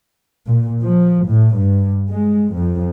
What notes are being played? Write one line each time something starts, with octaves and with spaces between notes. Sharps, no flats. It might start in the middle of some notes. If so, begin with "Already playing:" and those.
A#2
F3
A2
G2
G#3
F2